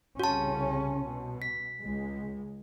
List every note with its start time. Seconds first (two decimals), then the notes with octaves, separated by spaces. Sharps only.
0.19 C2 C#3 C#4 F#4 A5
1.07 B2
1.42 B6
1.81 C#2 G#3